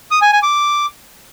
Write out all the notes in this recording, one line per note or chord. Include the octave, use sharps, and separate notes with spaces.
D#6
G#5
G#5
D6